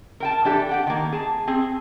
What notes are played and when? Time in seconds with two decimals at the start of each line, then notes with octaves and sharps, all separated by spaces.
0.20 A#4 G5 A5
0.44 E3 D4 G4 A4
0.69 G4 F#5 G5
0.87 D#3 A#3
1.12 G#4 A5
1.47 C4 G#4